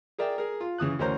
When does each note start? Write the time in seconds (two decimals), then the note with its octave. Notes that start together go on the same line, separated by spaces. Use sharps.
0.18 G#4 A#4 D5 E5 G5
0.38 G#4 A#4
0.61 F4
0.78 C#3 E3 D#6 F#6
0.99 D2 E3 C#4 A#4 C5 A#5